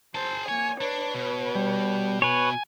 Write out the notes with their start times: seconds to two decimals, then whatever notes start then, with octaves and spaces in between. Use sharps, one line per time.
0.15 G#4 C5 A5
0.49 A#3 C#5 G#5
0.81 D4 B4 C#5
1.14 B2
1.55 G3
2.22 B4 C#5 G#5